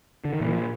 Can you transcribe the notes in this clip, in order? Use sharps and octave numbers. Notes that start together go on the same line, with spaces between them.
D3
D#3
A#2 E3
F3